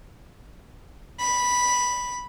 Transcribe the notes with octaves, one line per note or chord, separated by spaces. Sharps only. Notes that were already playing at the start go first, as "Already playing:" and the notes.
B5